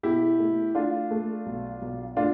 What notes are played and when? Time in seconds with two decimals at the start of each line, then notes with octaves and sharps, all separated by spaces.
0.03 B2 E4 G4
0.39 A3
0.75 A3 D4 F4
1.11 A3
1.46 B1
1.82 B1
2.17 A3 D4 F4